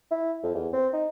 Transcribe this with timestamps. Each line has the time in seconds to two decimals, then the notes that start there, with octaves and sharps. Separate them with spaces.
0.11 E4
0.43 F2
0.55 E2
0.73 C4
0.93 D#4